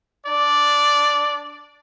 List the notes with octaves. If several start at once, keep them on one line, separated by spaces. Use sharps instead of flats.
D4 D5